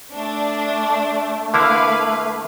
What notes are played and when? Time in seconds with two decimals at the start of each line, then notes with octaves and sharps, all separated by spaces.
0.13 A3 D4
1.54 D3 A#3 E4 B4 F5